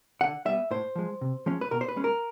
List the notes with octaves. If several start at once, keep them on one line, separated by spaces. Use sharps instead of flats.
D3 F#5
G3 B3 E5
A2 C5
F3 G#3
C3
F3 G#3 C#4
B4
B2 A#4
C5
B4
G#3 C#4
A#4